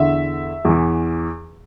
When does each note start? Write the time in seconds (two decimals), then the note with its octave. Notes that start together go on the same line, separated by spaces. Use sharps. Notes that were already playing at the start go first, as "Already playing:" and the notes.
Already playing: E2 D3 E5
0.65 E2 E3